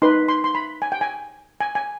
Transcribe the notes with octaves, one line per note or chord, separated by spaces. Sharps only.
D#4 B4 C6
C6
C6
B5
G#5
G5
G#5
G#5
G#5